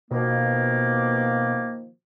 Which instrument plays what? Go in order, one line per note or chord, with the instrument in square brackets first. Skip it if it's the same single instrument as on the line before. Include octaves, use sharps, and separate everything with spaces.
[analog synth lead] B2 [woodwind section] D#3 F3 A#3